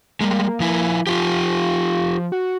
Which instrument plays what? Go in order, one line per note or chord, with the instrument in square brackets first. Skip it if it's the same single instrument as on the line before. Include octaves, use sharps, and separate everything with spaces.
[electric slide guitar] G3 G#3 [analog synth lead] A#3
[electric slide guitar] F3 E4
[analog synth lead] F3 [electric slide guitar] F4 G4
[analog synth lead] F#4